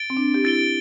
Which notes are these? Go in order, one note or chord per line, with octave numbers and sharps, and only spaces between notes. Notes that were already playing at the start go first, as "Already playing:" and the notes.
Already playing: A6 D7 G7
C4
D4
G4
E4 A6 D7 G7